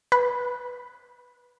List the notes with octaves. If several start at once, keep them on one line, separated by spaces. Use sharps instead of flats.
B4